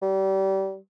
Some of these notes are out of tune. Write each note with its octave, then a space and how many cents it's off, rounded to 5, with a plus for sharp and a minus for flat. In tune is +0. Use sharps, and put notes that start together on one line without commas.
G3 -30